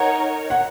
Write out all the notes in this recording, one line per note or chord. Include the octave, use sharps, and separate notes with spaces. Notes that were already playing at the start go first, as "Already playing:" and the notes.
Already playing: D#4 A#4 C#5 F#5
F#5